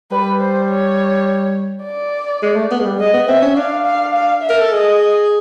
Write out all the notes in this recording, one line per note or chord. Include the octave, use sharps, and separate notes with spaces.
G3 B4
C5
C#5
D5
G#3
A3
B3
G#3
G3
G#3 D#5
B3
C4 E5
C#4
D4 F5
F5
F5
E5
A#4
A4
G#4 D#5